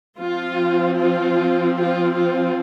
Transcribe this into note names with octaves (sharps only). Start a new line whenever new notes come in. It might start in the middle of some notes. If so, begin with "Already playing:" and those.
F3 C4 F4
F4
F4
F4